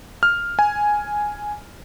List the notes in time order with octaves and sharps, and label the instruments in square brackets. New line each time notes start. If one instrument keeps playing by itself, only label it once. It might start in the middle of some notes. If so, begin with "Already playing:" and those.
[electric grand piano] F6
G#5